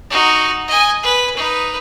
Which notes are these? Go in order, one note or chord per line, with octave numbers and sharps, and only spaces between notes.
D#4 F#4
D#5 G#5
B4
D#4 B4